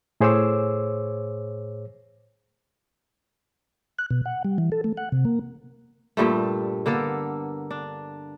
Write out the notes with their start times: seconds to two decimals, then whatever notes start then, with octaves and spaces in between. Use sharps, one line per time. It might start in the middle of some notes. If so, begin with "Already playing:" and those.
0.21 A2 G#4 C5 C#5 D6 E6
3.99 F#6
4.11 B2
4.25 F#5
4.45 G3
4.58 E3
4.72 A4
4.84 A3
4.97 F#5
5.12 C3
5.25 A#3
6.17 G2 A#2 G3 A3
6.86 D3 A#3 B3 A4
7.71 D4